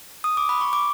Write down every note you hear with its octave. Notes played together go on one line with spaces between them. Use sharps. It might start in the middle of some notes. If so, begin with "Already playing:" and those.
D#6
D6
B5
C#6
D6